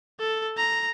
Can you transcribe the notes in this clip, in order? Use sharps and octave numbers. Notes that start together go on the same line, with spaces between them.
A4
A#5